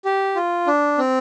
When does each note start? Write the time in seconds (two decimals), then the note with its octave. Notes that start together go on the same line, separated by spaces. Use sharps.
0.05 G4
0.36 F4
0.67 D4
0.98 C4